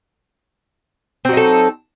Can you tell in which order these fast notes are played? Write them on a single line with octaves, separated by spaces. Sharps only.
C4 F#3 D#4 A4